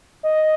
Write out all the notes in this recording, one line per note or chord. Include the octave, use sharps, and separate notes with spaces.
D#5